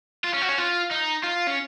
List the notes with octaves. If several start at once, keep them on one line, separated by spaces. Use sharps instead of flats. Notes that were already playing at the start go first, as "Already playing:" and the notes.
F4
C#4
F#4
C#4
F4
D#4
F4
C#4